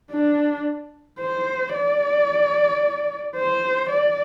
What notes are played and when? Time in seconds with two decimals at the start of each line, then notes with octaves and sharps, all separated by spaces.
0.12 D4
1.20 C5
1.74 D5
3.36 C5
3.90 D5